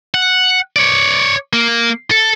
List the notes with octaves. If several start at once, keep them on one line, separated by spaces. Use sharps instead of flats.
F#5
C#5 D5
A#3
A4